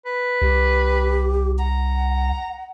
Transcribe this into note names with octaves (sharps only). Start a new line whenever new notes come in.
B4
C2 G4
F#5 A#5